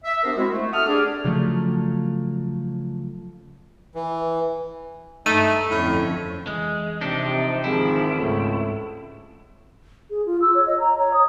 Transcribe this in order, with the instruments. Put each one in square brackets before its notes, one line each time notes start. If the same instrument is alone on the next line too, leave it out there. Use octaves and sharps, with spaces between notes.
[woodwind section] E5
B3 D4 G4 A#4 C5
G#3 C4 E4 F#4
A3
A4 F#5 A5 D#6 F6
D4 G4 G#4 D5
[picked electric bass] C#3 F3 F#3 A3
[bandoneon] E3
[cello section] G2 G3 [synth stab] A3 [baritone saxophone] D#4 [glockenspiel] D#7
[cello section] F2 D3 C#4 [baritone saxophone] A2
[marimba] E3 [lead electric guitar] G#3
[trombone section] C3 [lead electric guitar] F3 D#4 [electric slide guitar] D4
[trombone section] G#2 D#3 F3 [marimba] C4 G4 G#4 [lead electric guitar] E4
[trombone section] C#2 A3 [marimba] G#2 G#3
[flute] G#4
F4
E6
C#5
D#5
A#5
C#5
D#6